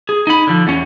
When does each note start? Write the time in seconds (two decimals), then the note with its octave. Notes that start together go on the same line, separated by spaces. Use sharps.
0.09 G#4
0.27 D#4 B5
0.47 D3 F3
0.67 E2 C#4